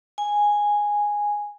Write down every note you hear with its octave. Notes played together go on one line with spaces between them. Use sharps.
G#5